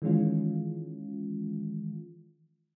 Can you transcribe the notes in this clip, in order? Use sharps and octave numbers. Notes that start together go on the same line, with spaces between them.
D#3 E3 G#3 C#4 F4